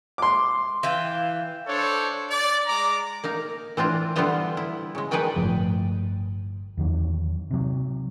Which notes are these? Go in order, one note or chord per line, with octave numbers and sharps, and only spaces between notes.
C6 D6
E3 F5 G5
D4 A4 C5 C#5
D5
G#3 A#5 D6
A#3 D#4 A#4
E3 C4 D4 F4
D3 E3 G3 B3 F4 C5
E4
C#3 G#3
D#3 G#4 B4 D5 G5 G#5
G1 A2 F3
E2 D#3 F#3
C3 F#3